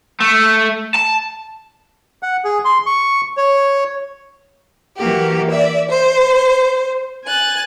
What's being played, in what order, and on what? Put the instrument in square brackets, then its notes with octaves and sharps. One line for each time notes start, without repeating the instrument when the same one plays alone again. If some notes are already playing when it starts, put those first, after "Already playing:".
[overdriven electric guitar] A3
A5
[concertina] F#5
G#4
C6
C#6
C#5
[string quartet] E3 A#3 F#4 G4
D5 E5
C5
G#5 F#6 A6